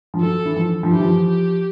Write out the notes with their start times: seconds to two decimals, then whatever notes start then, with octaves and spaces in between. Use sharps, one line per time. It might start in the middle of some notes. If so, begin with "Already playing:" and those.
0.14 F3
0.21 F#3 A4
0.45 E3
0.56 F3
0.83 F3
0.92 E3 G4
1.01 F3
1.27 G4